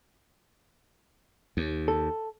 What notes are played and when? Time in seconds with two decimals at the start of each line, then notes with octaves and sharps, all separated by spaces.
1.57 D#2
1.88 A4